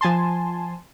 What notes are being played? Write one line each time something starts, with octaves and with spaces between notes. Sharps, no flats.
F3 G#5 A5 C6